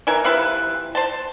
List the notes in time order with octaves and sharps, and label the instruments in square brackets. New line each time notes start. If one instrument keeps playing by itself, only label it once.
[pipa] E3 A#4 G#5
C3 F3 E4 B4
C5 A5